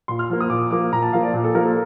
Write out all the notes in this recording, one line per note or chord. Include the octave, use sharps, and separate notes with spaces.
A#2 C6
F6
F3 A#3
D#6
A#2 D6
F3 A#3 D6
A#2 A#5
A5
F3 A#3 F5
D5
A#2
A4
F3 A#3 A#4
A4